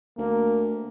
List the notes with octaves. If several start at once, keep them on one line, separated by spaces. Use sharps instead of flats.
D2 A#3